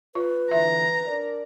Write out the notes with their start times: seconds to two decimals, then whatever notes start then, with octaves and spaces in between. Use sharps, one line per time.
0.15 F4 B4
0.51 D3 E3 E5 A#5
1.07 D4 A#4 D5